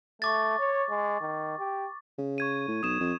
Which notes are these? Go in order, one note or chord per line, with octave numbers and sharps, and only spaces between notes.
A3 C#6 D6 A6
C#5
G#3
D#3
G4
C#3
C#6 G#6 D#7
A2
B1 D#6 E7
F2